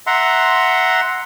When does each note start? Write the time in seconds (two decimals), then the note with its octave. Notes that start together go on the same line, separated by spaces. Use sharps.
0.07 E5 F#5 A#5 C6